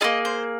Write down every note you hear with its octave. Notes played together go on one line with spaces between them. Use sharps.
A#3 F4 G#4 D#5
C5